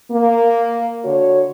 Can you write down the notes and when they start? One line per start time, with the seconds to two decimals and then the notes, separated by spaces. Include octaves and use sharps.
0.11 A#3
1.05 D3 F#4 C#5